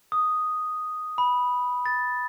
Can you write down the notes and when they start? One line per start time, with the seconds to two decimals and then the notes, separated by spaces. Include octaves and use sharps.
0.12 D#6
1.18 B5
1.86 A6